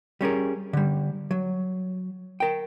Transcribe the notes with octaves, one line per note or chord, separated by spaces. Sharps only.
G3 C#4 G#4 A#4
D3 G3
F#3
A#4 G5